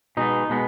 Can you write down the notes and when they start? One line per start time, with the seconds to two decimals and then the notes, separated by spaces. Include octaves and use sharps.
0.17 B2 G#3 B3 D#4
0.49 B2 G#3 B3